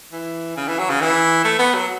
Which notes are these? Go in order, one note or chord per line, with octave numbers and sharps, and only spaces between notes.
E3
C#3
E3
F#3
C#3
E3
A3
B3
F#3